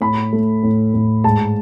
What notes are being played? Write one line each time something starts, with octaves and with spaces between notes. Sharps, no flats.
A2 B5
A3
A2
A2
G#2 A5